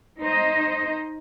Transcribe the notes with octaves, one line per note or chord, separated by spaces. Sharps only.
D#4 C5 D#5